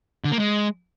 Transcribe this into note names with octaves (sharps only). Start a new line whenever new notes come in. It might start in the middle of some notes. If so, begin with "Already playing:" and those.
D3
A#3
G#3